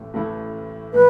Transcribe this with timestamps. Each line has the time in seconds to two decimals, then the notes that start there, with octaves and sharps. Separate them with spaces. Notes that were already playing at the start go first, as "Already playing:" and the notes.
Already playing: A1 A2 A3
0.14 A1 A2 E3 A3 E4
0.93 A2 E3 B4